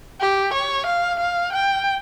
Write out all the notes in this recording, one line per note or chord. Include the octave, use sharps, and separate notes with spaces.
G4
C#5
F5
F5
G5